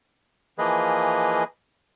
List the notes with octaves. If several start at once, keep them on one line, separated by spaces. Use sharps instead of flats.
E3 F3 A#3 G#4 B4 D#5